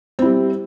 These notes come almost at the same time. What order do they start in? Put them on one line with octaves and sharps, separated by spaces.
C4 E4 G3